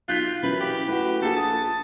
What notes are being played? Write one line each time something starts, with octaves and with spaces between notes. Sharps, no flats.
B1 F4 F#6 G6 B6
F#2 E3 B4
G4
A2 F#4 B4
A#1 A#3 G#4 A4
A5 D#6